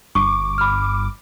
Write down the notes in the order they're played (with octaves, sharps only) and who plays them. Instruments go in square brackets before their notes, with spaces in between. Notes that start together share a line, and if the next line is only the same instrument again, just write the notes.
[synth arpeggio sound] G1 D6 [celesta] C#6
[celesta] B5 F6